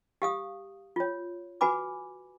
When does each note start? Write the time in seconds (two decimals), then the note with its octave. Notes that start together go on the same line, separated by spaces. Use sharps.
0.22 G4 F5 D#6
0.96 F4 C#5
1.61 F#4 B4 G#5 B5 D6